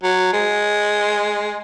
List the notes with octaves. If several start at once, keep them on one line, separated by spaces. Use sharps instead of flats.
F#3
G#3